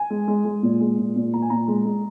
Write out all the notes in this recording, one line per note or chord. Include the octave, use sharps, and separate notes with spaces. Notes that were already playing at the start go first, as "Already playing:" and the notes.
Already playing: G#5
G#3
G#3
G#3
A#2
G#3
A#2
A#2
A#2 A#5
G#5
A#2 A#5
G#3
G#3